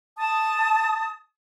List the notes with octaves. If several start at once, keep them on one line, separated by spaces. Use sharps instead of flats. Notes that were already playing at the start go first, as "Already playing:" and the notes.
A5 D#6